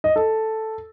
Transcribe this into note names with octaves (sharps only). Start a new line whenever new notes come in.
D#5
A4